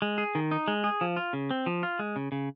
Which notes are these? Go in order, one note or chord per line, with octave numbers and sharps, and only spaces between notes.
G#3
G#4
D#3
D#4
G#3
G#4
F3
F4
C#3
C4
F3
F4
G#3
C#3
C#3